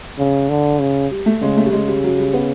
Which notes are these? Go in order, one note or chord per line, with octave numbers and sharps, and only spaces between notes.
C#3
D3
C#3
G3
A3
C#3 G#3
A3
G3
C#3 G#3
G3
F#3
G3
B3